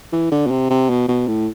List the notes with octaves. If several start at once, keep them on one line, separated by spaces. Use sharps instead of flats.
E3
D3
B2
C3
C3
B2
B2
A2